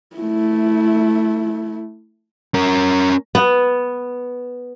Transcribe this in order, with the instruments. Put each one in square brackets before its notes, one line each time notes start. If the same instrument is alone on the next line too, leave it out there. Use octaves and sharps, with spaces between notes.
[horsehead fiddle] A3 E4
[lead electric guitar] C#4 A#4
[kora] B3